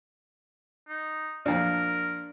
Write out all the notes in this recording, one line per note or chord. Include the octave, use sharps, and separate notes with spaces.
D#4
F2 A#2 D4 A#4